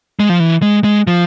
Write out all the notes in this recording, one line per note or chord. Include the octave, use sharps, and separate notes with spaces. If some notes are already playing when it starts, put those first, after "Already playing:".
G#3
F3
E3
G#3
G#3
F3